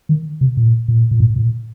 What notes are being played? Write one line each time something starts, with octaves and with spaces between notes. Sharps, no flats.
D#3
C3
A#2
A#2
A#2
G#2
A#2